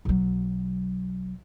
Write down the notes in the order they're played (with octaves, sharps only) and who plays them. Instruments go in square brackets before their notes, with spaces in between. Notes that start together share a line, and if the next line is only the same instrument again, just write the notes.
[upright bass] B1 F#3